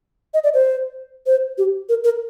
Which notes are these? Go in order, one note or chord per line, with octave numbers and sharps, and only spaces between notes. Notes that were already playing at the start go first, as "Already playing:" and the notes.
D#5
D5
C5
C5
G4
A#4
A#4